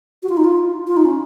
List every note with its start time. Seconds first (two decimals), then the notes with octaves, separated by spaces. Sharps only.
0.23 F#4
0.29 F4
0.37 D#4
0.44 F4
0.87 F4
0.97 D#4
1.05 C#4